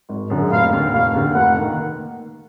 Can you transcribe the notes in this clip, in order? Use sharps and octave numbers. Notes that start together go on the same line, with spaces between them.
G#1
F#2 D3 G#3
F1 F5
D#2 D3
F1 F5
D#2 D3
F1 F#5
D#3 A#3